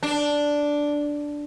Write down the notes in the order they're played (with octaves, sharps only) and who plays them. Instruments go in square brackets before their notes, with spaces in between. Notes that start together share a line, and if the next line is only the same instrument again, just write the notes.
[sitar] D4